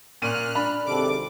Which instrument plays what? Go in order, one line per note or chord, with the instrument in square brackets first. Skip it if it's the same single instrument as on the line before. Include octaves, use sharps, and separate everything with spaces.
[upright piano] A#2 D#7 [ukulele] C#4 [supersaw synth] F6 F#6
[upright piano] D4 [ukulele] B5
[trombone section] G#1 C3 A4 [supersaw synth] D6